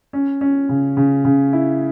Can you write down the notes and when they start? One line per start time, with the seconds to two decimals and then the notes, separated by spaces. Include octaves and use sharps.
0.13 C#4
0.41 C#4
0.69 C#3
0.97 C#3
1.25 C#3
1.53 E4